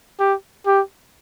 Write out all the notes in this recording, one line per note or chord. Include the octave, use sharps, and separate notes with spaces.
G4
G4